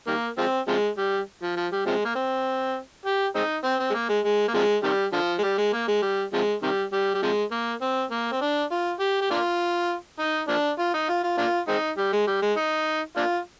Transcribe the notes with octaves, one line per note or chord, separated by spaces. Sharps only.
D#3 G3 A#3
F3 G#3 C4
C3 F3 G#3
G3
F3
F3
G3
C3 F3 G#3
A#3
C4
G4
G#3 C4 D#4
C4
C4
G#3
A#3
G#3
G#3
A#3
C3 F3 G#3
C3 D#3 G3
D3 F3
G#3
G3
G#3
A#3
G#3
G3
C3 F3 G#3
C3 D#3 G3
G3
G3
C3 F3 G#3
A#3
C4
A#3
C4
D4
F4
G4
G4
A#3 D4 F4
D#4
F3 A#3 D4
F4
D#4
F4
F4
A#3 D4 F4
G#3 C4 D#4
G3
G#3
G3
G#3
D#4
A#3 D4 F4